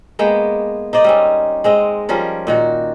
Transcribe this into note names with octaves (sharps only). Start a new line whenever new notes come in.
G#3 A#3 B3 G5
D#4 C5 D5 D#5
G3 C4 C#4
G#3 C4 D#5
F3 G3 C#4 A#4
A#2 D#3 F#4